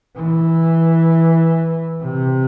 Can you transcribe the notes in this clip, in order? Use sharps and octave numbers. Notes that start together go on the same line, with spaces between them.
E3
C3